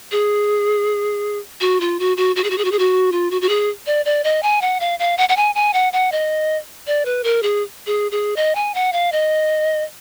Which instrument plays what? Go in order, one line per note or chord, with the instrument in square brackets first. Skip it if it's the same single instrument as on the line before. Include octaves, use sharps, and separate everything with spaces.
[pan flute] G#4
F#4
F4
F#4
F#4
F#4
G#4
F#4
G#4
F#4
G#4
F#4
F4
F#4
F#4
G#4
D5
D5
D#5
G#5
F#5
F5
F5
F#5
F#5
G#5
G#5
F#5
F#5
D#5
D5
B4
A#4
G#4
G#4
G#4
D#5
G#5
F#5
F5
D#5